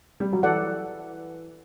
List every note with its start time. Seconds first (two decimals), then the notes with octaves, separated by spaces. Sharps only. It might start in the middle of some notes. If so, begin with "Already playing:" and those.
0.20 G3
0.33 F#3
0.43 E3 A4 D5 F#5